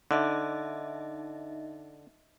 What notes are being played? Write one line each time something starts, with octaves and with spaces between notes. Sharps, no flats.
D3 D#4 D#5 E5